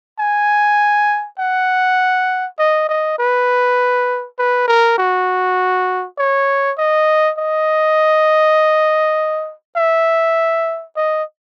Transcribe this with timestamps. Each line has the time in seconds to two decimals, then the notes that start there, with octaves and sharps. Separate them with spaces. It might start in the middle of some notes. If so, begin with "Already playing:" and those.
0.19 G#5
1.39 F#5
2.59 D#5
2.89 D#5
3.18 B4
4.38 B4
4.68 A#4
4.98 F#4
6.18 C#5
6.78 D#5
7.38 D#5
9.76 E5
10.96 D#5